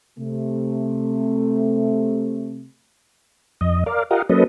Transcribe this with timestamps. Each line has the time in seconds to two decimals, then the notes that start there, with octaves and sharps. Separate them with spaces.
0.19 C3 A3
3.61 F2 D#5
3.86 A#4 D5 F5
4.11 F4 G4 A#4 D#5 F5 F#5
4.29 F#3 A#3 C#4 A4 B4 D#5